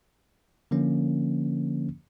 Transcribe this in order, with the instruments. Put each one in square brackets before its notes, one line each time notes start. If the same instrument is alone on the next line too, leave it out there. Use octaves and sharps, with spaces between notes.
[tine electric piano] D3 F3 A#3 C#4